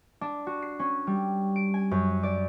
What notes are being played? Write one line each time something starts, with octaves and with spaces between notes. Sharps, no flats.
D4
F#4
C7
C#4
G3
D7
G#5
F#2
D5